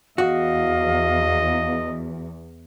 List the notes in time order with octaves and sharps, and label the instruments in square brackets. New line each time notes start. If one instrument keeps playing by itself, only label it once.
[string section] E2 [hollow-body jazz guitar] F#4 [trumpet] D#5 [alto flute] F5